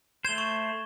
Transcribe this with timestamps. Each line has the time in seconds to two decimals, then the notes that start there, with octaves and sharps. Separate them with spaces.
0.25 A3 C5 G#6 E7 G7
0.38 C#6